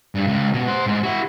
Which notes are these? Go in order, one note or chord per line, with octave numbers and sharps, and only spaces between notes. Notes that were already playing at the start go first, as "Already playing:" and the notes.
G2
C#2
B2
C5 F#5
G#2
E4 F#4